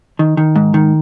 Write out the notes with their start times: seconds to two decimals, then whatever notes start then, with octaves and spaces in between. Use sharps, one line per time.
0.19 D#3
0.37 D#3
0.56 G#2
0.74 D#3